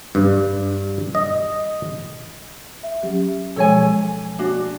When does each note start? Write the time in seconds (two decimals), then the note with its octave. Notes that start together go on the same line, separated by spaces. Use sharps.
0.15 G2
1.15 D#5
2.83 E5
3.03 F#3 C#4 G4
3.56 B2 F3 G#3 A4 C#5 G#5
4.39 D4 F#4